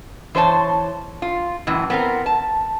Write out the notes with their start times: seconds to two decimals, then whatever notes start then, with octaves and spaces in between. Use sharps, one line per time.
0.35 E3 C5 C#5 A5
1.22 F4
1.67 F#2 A2 E3
1.90 B3 C4 A#4
2.26 A5